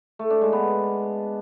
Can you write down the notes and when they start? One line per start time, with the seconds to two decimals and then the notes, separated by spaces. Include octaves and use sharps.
0.19 A3
0.30 D4
0.41 G#3
0.53 B3